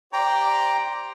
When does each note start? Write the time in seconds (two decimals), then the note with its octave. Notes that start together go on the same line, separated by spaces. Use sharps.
0.13 G4 C5 D5 G5 A#5